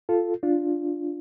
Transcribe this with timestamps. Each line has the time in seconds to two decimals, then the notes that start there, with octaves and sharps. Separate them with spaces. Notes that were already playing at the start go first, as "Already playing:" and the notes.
0.09 F4 A4
0.43 D4 F4